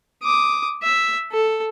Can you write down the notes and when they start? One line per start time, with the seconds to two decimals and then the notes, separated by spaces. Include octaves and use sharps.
0.23 D6 D#6
0.83 E5
1.32 A4